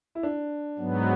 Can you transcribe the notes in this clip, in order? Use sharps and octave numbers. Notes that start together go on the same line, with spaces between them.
E4
D4
G#2 F#3 B3